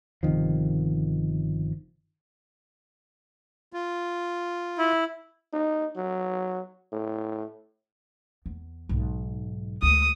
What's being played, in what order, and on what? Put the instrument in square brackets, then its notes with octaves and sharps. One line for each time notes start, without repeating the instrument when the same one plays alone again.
[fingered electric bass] G1 C3 D#3 F3
[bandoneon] F4
[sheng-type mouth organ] E4
[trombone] D#4
F#3
A2
[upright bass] E2
B1 G#2
[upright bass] D2 G#3 [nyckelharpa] D#6